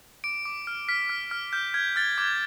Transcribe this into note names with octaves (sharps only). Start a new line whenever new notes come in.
D6 D7
D6
F6
F6 B6
F6
F6
F6 G6
F6 G#6
F6 A6
D6 G#6